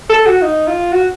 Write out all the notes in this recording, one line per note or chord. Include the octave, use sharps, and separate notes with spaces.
A4
F#4
D#4
F4
F#4